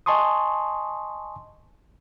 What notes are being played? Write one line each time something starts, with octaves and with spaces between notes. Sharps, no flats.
D#5 G#5 A5 C6 C#6 D#6